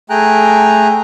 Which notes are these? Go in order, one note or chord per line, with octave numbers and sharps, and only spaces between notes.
A3 G#4 G5 G#5 A#5 F#6